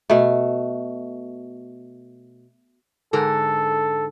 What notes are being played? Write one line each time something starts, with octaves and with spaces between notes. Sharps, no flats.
B2 A3
G#2 D3 A4 A#4